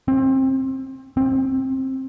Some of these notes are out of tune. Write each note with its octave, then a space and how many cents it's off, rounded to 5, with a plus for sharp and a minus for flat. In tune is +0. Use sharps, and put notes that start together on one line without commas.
C4 +25
C4 +20